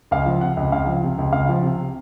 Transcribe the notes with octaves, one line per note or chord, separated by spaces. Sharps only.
C#2 F5
F3
C3 F#5
C#2
C#2 F5
F3
C3
C#2
C#2 F5
F3
C3